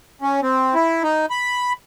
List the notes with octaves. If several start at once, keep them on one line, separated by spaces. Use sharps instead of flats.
C#4
C4
E4
D#4
B5